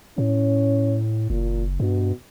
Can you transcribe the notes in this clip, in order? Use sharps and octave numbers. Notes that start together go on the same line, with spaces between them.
A2 C#4
F#1 A#2
G2 B2